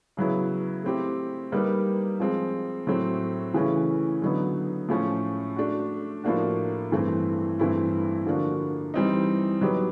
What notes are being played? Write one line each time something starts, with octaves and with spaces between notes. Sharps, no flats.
C#3 F#3 B3 E4
A3 C4 E4 G4
G3 A#3 D#4 G4 B4
F3 G#3 C4
A2 F#3 A3 C4
C#3 E3 A3 C#4 E4
D3 F#3 B3 D#4
A2 F3 A3 C#4
A3 D4 F#4
A2 F3 A#3 D4 F#4
G2 E3 A3 C4
G2 E3 A3 C4 E4
D3 F3 A#3 D4 F#4
E3 G3 C4 D#4
F#3 B3 D#4 G4 B4